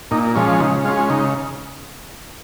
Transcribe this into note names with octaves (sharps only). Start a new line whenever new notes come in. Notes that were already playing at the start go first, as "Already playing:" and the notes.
A#2 D#4
F3 G#3 C#4
C#3 D#4
G#3 C#4 F4
C#3 D#4